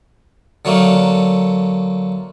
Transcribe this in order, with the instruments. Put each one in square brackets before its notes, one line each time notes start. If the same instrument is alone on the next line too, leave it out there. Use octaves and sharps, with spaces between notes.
[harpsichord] D3 F#3 A3 A#3